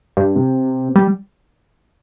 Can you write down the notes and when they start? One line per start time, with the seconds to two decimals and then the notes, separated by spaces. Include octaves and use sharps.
0.17 G2
0.36 C3
0.96 G3